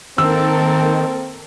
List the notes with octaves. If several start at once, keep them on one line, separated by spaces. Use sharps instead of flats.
D#3 A#3 C4 A4 A#4 E6